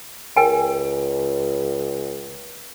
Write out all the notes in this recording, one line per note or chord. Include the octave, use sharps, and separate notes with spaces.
C#2 A#4 G5 G#5